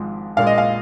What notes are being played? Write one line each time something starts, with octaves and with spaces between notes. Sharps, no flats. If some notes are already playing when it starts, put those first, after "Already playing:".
Already playing: G#1 G#2 F3 G#3
A#1 A#2 G#3 F5
D#5
F5